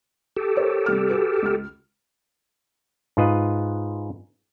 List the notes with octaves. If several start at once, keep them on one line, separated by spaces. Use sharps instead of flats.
G4 A4
A#4 C5 C#5
C3 G3 F6
F#4 G#4 B4
C#2 F6
G#2 F4 B4 D#5